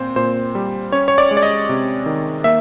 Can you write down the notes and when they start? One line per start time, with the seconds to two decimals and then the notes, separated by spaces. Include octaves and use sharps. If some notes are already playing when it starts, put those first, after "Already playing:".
Already playing: A#2 C4 C5
0.16 A#2 C5
0.55 G3
0.92 C#4 C#5
1.08 C#5
1.18 D5
1.31 G#3
1.37 D5
1.43 D#5
1.69 C3
2.06 D#3
2.44 A#3 E5